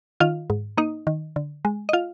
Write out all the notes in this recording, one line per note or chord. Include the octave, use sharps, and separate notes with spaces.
D#3 F4 F5
G#2
A#3 D#4 D#5
D#3
D3
G#3
D#5
F4 F5